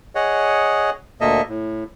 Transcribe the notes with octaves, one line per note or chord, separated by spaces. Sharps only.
G#4 C#5 D#5 F#5
D2 A#2 A#3 A4 D#5 E5
A2